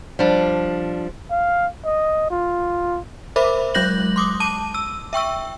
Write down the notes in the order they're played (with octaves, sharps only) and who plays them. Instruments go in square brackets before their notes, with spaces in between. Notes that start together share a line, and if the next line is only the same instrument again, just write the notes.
[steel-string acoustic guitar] F3 G3 D4
[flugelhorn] F5
D#5
F4
[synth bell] A#4 C5 E5 B5 D6
F#3 G#3 F#6 G6 A#6 F#7
C6 D6 D#6
A5 D6 D#7
E6
E5 G5 C#6 E6